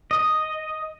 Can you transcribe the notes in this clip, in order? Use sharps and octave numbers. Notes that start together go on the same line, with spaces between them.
D#5